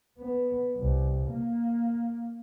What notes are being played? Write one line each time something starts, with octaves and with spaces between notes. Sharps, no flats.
B3
C2
A#3